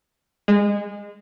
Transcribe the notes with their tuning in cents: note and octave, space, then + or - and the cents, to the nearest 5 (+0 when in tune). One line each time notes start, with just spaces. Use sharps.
G#3 -25